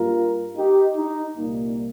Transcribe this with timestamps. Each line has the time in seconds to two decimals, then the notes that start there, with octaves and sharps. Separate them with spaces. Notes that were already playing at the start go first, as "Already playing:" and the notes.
Already playing: G2 G3 A#3 F4 A#4
0.57 D#4 G4
0.97 D#4
1.36 C2 A#2 G3 A#3